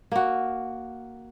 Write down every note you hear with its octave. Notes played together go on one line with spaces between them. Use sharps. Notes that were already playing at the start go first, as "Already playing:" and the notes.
A#3 F#4